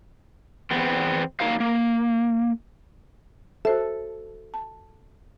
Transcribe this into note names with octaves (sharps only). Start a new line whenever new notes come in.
E2 B3 C4
F#3 A#3 D4 D#4 C5 F5
A#3
F#4 A4 C5 E5
A5